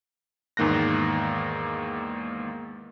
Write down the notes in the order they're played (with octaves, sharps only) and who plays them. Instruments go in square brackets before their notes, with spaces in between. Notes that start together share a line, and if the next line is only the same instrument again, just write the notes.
[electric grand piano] E2 G#2 D#3 A#3 F#6 A#6